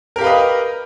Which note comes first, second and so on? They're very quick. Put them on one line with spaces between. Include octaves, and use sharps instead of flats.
A#4 G4 F5 B4 D#5